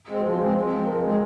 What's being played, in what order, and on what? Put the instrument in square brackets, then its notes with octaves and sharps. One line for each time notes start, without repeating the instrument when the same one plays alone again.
[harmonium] G#3 C4
[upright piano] F#4
[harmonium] F3 [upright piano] G#4
[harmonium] G#3 C4 [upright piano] C5
[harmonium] F3
G#3 C4
[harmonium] F3 [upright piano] A#4
[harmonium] G#3 C4 [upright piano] G#4